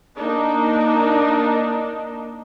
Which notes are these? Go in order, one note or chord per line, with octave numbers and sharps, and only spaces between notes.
A#3 D4 D#4